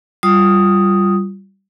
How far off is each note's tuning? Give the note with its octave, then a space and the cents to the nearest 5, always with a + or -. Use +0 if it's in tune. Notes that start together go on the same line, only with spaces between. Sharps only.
G3 -15 F4 +0 D#6 +0